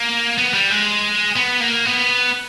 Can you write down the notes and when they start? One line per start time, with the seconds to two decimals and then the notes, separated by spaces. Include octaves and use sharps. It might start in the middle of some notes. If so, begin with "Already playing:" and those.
Already playing: A#3
0.38 B3
0.54 G3
0.70 G#3
1.36 B3
1.60 A#3
1.85 B3